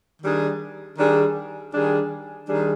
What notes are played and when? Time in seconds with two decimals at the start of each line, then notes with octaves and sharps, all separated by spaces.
0.23 D#3 G3 D4 G#4
0.97 D#3 G3 D4 G#4
1.73 D#3 G3 D4 G#4
2.47 D#3 G3 D4 G#4